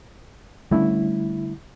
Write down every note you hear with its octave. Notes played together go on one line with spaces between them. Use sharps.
D3 G3 A3 C#4 E4